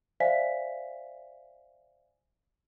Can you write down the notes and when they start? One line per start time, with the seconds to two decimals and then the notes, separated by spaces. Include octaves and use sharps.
0.20 C5 D5 E5 F5 G#5 B6